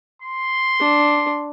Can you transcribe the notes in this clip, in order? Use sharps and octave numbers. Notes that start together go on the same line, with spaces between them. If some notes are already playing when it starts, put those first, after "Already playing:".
C6
D4